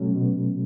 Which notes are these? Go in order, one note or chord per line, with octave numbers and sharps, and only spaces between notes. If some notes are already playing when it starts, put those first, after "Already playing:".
Already playing: B2 F#3 A3 C#4
B2